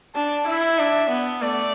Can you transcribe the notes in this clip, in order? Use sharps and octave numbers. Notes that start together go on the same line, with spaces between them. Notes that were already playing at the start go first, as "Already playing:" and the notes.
D4 A5
E4 E5
D4
B3
A3 D5